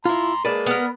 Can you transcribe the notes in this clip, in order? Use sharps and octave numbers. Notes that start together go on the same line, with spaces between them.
E4 F4 A#5 C6
G#3 A#3 B4 D5 A5
B3 A#4